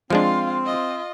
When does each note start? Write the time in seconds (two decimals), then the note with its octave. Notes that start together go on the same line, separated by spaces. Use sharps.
0.10 F3 G#3 C4 D4 F4 F5 C6
0.65 F4 D#5